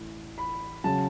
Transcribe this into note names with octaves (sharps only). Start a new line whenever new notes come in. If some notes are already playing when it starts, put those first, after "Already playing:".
Already playing: A1 A2
B5
C#3 F#3 A5